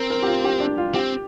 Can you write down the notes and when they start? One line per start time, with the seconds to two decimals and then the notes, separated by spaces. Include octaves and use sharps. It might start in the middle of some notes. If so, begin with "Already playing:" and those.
Already playing: C4 A#4
0.10 A#4
0.23 G4
0.27 F4
0.44 G4
0.60 D4
0.78 F4
0.94 C4 G4